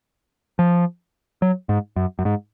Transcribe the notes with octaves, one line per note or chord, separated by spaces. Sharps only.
F3
F#3
G#2
F#2
F#2
G#2